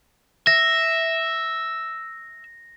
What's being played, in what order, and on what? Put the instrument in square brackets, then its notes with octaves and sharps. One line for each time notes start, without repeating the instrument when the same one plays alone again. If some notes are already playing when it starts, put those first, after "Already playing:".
[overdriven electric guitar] E5 [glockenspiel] A#6